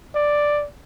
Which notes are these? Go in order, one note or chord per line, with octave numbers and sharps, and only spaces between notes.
D5